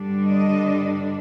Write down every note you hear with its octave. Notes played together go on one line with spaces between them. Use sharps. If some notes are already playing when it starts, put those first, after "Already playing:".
Already playing: G2 D3 G3 D4
D#5